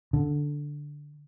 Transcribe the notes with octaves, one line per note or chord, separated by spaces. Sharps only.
D3